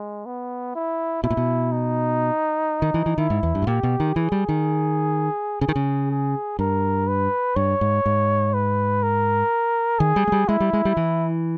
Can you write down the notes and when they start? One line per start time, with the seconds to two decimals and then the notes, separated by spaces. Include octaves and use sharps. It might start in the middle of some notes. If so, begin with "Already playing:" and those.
Already playing: G#3
0.26 B3
0.75 E4
1.23 B2 E4
1.30 A#2
1.37 B2
1.72 D#4
2.82 D#3
2.94 E3
3.06 E3
3.18 D#3 E4
3.30 G#2
3.43 E2
3.55 G2
3.62 G#2
3.67 A#2 G4
3.83 B2
4.00 D#3
4.16 E3 G#4
4.32 G3
4.49 D#3
5.61 C#3 G#4
5.68 D#3
5.76 C#3
6.11 G#4
6.59 G2 A#4
7.08 B4
7.56 G2 C#5
7.81 G#2
8.06 G#2
8.54 B4
9.03 A#4
9.99 D#3 G#4
10.16 G3
10.27 G#3
10.32 G3
10.48 G#3 E4
10.60 G3
10.73 G#3
10.85 G3
10.97 E3